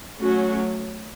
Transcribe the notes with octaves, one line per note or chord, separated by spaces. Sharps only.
F#3 A3 C#4 F#4